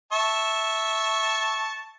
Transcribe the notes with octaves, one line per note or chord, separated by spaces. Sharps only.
E5 A5 C#6